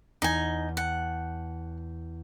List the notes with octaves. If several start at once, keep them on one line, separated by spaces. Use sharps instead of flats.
E2 D#4 G#5
F#5 G5 A5